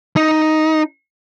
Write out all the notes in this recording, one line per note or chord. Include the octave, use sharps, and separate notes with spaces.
D#4